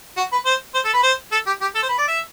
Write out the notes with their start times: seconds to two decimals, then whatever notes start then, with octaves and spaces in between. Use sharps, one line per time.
0.17 F#4
0.32 B4
0.46 C5
0.74 C5
0.85 A4
0.94 B4
1.03 C5
1.32 A4
1.46 G4
1.61 G4
1.75 A4
1.83 C5
1.89 B4
1.98 D5
2.08 E5